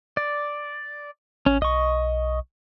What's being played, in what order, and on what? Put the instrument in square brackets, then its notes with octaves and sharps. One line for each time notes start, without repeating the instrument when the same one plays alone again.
[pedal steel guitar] D5
[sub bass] A1 [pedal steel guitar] C#4
[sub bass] B1 [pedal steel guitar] D#5 C#6